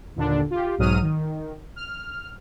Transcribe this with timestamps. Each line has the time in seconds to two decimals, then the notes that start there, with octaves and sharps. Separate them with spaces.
0.16 D#2 A#2 D3 D4
0.51 F4 G4
0.78 B1 G#2 F#3 D#6 F6 D#7
1.02 D#3
1.76 F6